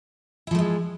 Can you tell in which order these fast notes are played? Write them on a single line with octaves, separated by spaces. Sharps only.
E4 F3 A3 G#3